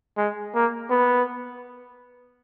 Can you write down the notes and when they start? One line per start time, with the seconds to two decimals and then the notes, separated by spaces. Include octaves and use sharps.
0.17 G#3
0.55 A#3
0.90 B3